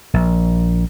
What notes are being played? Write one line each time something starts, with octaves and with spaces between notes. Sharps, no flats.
A#1